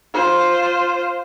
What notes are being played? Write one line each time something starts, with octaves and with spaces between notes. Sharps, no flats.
F4 C5